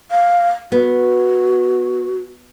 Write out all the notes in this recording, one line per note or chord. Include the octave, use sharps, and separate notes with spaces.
F5
B3 F#4